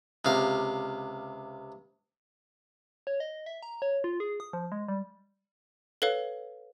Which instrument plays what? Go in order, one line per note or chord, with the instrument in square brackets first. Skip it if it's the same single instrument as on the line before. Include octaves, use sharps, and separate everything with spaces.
[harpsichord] C#2 C3 F5
[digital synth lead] C#5
D#5
E5
A#5
C#5
F4
G#4
D#6
F3
G#3
G3
[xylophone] A4 B4 C#5 F5